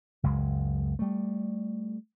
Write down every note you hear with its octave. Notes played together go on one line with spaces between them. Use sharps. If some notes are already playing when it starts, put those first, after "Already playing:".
F#1 C#2 G#3
G3 A3